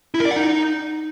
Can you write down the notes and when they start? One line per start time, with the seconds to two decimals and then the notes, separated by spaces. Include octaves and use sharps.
0.14 E4
0.20 A#4
0.25 D5
0.31 F#5
0.36 D#4